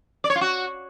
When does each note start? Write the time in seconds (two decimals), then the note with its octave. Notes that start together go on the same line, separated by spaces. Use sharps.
0.24 D5
0.30 C#5
0.35 F4
0.41 F#4